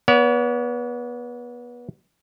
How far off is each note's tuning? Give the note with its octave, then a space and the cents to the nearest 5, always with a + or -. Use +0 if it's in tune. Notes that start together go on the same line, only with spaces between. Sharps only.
B3 -25 C#5 +45